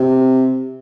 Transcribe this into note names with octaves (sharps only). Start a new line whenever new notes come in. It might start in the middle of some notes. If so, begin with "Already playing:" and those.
Already playing: C3